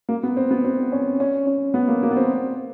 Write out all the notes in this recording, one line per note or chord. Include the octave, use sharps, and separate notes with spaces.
A#3
B3
C4
B3
C4
C#4
C#4
C#4
B3
A#3
A#3
B3
C4